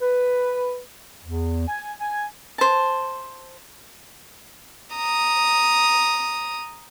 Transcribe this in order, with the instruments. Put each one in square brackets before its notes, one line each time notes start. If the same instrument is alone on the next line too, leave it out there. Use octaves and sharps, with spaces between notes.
[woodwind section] B4
E2
G#5
G#5
[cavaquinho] C5 A5
[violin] A#5 D#6